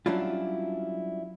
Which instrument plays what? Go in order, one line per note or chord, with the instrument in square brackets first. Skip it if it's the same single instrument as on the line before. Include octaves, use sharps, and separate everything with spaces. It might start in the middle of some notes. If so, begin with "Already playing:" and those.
[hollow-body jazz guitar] F#3 G3 C#4 D4 E4 F4